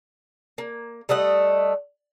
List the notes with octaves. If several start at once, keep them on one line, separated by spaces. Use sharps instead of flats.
A#3
G3 A3 D#5 F#5